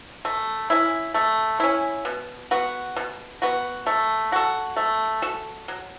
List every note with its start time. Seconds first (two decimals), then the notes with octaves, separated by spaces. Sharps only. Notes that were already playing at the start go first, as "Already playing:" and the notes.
0.25 A3
0.70 C#4 E4
1.14 A3
1.60 C#4 E4
2.05 B2
2.51 B3 F#4
2.96 B2
3.42 B3 F#4
3.87 A3
4.32 F#4 A4
4.77 A3
5.22 F#4 A4
5.68 F#3